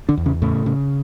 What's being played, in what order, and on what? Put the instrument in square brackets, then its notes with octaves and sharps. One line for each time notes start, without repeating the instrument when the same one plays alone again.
[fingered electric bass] D3 D4
E2
C#3 C#4
A2 C#3 A3
C#3